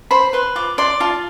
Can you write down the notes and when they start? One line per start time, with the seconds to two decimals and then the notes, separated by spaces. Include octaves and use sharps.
0.11 C5 B5
0.33 B4 C6
0.55 F4 D6
0.78 D5 C6
1.00 F4 A5